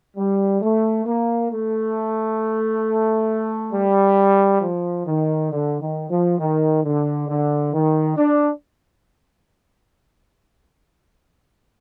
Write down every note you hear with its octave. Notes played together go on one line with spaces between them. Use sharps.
G3
A3
A#3
A3
G3
F3
D#3
D3
D#3
F3
D#3
D3
D3
D#3
D4